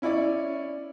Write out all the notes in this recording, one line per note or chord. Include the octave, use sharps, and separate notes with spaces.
C#4 E4 C#5 D5